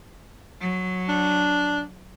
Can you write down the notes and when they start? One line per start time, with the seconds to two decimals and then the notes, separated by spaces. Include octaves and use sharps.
0.61 F#3
1.08 D4